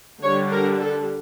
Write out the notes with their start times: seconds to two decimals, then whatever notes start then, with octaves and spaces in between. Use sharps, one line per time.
0.23 D3 G3 D4 C#5
0.52 A#4
0.80 A4